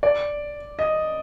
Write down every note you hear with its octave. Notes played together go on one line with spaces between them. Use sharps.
D5
D#5